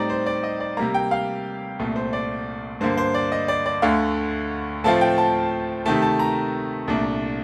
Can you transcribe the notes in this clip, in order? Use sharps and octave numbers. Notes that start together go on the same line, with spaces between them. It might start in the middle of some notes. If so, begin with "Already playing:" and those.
Already playing: A2 G3 C4 D#4 D5 A#5
C5
D5
D#5
D5
C3 G3 A#3 A#5
G5
F5
C2 A#2 A3
C5
D5
G2 D3 G3 A#3 C5
C5
D5
D#5
D5
D5
D2 D3 A3 F5
A2 F3 A3 C4 F4 A5
G5
A5
C3 D#3 A3 A5
A5
A#5
C2 A#2 A3 D4